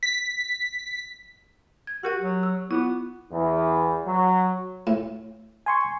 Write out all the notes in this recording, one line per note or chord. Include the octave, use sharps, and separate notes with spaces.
B6
G#6
F#4 G4 A#4 F#5
F#3
E6
B3 E4 F4
E2
F#3
A2
G#5 C6 C#6